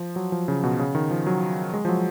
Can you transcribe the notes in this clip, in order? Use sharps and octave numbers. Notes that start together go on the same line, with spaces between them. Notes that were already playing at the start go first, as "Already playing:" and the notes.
Already playing: F3
F#3
F3
C#3
B2
C#3
D#3
F3
F#3
G#3
F3
F#3